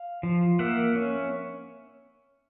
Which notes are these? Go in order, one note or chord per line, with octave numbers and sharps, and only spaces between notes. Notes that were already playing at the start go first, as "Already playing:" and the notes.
Already playing: F5
F3
A#3 E5 F#5
C#4